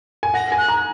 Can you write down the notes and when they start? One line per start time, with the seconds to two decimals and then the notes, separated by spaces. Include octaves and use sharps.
0.23 G#5
0.34 F#5 A#6
0.52 G#5
0.58 F#6
0.68 A#5